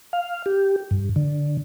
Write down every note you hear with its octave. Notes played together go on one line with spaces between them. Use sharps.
F5
G4
G2
D3